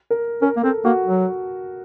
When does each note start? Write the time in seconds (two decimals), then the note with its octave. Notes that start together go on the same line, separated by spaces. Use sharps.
0.10 A#4
0.42 C#4 A#4
0.57 A#3
0.63 C4 A4
0.85 A#3 F#4
1.06 F#3